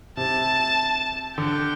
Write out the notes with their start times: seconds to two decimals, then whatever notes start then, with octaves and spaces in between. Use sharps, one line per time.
0.17 C3 A5
1.38 D3 G5